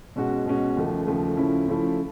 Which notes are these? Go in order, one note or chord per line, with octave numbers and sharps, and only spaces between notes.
B2 G#3 C#4 F#4
B2 G#3 C#4 F#4
D#2 C#3 F3 A3
D#2 C#3 F3 A3
C#3 F3 A3 C#4 E4
C#3 F3 A3 C#4 E4